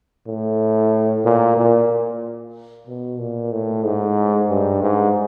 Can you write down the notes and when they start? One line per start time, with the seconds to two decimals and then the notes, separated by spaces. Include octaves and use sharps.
0.27 A2
1.25 A#2
1.57 A#2
2.87 B2
3.19 A#2
3.52 A2
3.84 G#2
4.50 G2
4.83 G#2